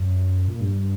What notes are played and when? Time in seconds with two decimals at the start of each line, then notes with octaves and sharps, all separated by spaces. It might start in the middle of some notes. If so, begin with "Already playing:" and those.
Already playing: F#2
0.48 A#2
0.60 G2